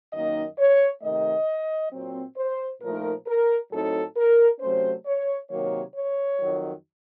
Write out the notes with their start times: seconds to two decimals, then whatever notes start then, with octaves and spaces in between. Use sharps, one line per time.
0.13 F#2 D#3 A#3 D#4 D#5
0.58 C#5
1.02 C3 D#3 A3 D#5
1.92 A#2 F#3 C4
2.36 C5
2.81 A#2 F3 A3 D#4 A#4
3.26 A#4
3.71 A2 F#3 C4 D#4 A4
4.16 A#4
4.60 C3 F#3 A3 C#4 C5
5.06 C#5
5.50 C3 D#3 F#3 A#3 C#5
5.95 C#5
6.40 F2 D#3 F#3